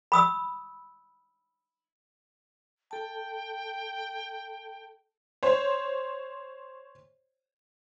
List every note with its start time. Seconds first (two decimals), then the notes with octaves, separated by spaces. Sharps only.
0.12 B5 D#6 E6
2.91 A4 G5 A5
5.43 C5 C#5